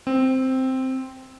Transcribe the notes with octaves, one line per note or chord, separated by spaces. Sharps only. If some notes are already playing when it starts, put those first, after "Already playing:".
C4